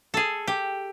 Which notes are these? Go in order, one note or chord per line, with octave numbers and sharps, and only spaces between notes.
G#4 A4
G4